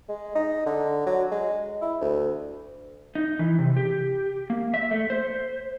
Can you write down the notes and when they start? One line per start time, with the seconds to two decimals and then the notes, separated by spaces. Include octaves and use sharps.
0.09 G#3
0.35 D#4
0.66 D3
1.06 F#3
1.31 G#3
1.82 E4
2.01 D2
3.15 D#4
3.39 E3
3.59 C3
3.77 G4
4.50 A#3
4.74 E5
4.91 A3
5.10 C5